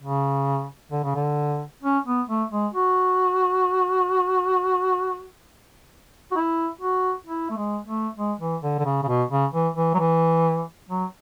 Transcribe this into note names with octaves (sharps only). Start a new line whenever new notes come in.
C#3
D3
C#3
D3
C#4
B3
A3
G#3
F#4
F#4
E4
F#4
E4
A3
G#3
A3
G#3
E3
D3
D3
C#3
C#3
B2
C#3
E3
E3
F#3
E3
F#3